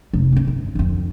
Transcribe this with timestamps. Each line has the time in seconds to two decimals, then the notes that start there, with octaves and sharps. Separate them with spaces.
0.13 F1 D#4
0.32 A#3 C#4
0.47 G1
0.75 F2 D3